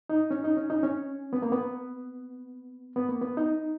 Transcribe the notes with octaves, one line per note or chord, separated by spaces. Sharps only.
D#4
C#4
D#4
C#4
D#4
C#4
B3
A#3
B3
B3
A#3
B3
D#4